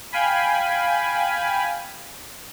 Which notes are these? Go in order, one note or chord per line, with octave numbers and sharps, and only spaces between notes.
F5 G5 G#5 B5